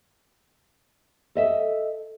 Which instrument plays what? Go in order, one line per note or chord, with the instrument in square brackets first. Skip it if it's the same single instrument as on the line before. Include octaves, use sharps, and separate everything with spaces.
[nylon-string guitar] A4 D#5 E5